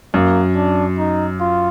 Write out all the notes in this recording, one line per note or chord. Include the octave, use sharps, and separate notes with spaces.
F#2 A#3
D4
D#4
F4